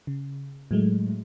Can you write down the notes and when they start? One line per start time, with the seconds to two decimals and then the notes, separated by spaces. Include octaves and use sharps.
0.07 C#3
0.71 A2 F#3 G#3 A3